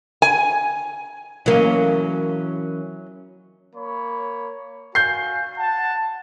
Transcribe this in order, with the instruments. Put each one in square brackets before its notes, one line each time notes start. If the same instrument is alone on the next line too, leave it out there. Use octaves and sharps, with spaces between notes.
[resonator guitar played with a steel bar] G#5
[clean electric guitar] E3 C#4 D#5 [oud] F#3 A#3
[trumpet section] A#3 C#5 B5
[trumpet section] F#4 F5 G#5 [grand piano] G6 C7
[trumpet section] F#5 A5